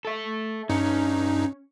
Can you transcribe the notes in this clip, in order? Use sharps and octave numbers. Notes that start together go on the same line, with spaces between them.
A4 E5
G2 C#4 D#4